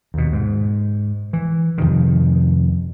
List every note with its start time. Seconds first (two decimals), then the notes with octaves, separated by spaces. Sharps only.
0.14 D#2 B2
0.32 G#2
1.33 E3
1.78 F2 C3 D#3